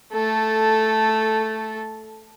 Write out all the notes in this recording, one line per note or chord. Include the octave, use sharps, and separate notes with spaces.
A3 A4